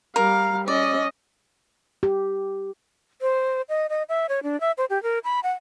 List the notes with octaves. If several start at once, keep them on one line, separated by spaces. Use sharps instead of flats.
G3 A#4 F5
C#4 D5 D#5
G4
C5
D#5
D#5
E5
C#5
D4
E5
C5
G4
A#4
B5
F#5